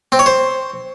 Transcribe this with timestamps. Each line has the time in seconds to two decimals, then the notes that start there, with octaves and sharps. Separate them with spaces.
0.12 C4
0.19 C#5
0.26 C5